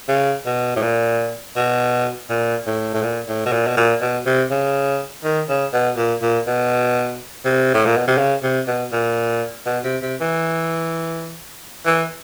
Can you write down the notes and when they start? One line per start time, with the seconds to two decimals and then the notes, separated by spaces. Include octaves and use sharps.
0.09 C#3
0.46 B2
0.76 A2
0.82 A#2
1.56 B2
2.30 A#2
2.67 A2
2.94 A2
3.03 A#2
3.28 A2
3.46 B2
3.53 A#2
3.67 B2
3.77 A#2
4.01 B2
4.26 C3
4.51 C#3
5.24 D#3
5.49 C#3
5.73 B2
5.97 A#2
6.22 A#2
6.47 B2
7.45 C3
7.74 A2
7.86 A#2
7.97 B2
8.08 C3
8.18 C#3
8.43 C3
8.68 B2
8.92 A#2
9.66 B2
9.84 C3
10.02 C3
10.21 E3
11.86 E3